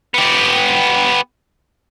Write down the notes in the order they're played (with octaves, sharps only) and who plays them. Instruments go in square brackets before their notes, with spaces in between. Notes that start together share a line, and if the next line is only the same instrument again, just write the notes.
[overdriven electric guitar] B3 G4